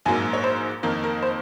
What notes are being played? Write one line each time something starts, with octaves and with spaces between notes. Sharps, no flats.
A#1 G#2 F#3 A#3 G#5
C#5
C5
F2 D#3 A#3 A#4
A#4
C5